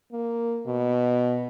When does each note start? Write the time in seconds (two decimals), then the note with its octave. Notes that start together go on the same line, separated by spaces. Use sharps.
0.12 A#3
0.66 B2